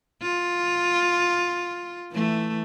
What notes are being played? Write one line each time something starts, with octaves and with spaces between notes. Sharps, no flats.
F4
E3 A3